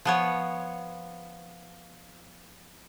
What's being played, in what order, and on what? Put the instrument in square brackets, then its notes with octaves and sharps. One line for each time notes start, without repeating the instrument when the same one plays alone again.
[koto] F3 B3 C#5